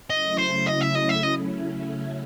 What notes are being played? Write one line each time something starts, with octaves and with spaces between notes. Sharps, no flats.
C#3 F#3 A3 C#4 E4 D#5
C5
D#5
E5
D#5
E5
D#5